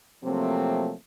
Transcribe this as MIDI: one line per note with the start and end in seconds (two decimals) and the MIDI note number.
0.24 0.93 48
0.24 0.93 53
0.24 0.93 54
0.24 0.93 57
0.24 0.93 58
0.24 0.93 60